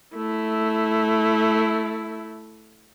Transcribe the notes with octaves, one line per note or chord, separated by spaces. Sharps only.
A3 E4